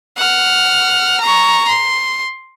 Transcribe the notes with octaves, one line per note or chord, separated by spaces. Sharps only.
F#5 F6
A#5 C#6
C6